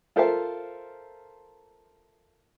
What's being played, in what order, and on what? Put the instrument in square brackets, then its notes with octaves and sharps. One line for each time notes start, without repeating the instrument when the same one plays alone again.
[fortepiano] F4 A4 A#4 C5 E5 F5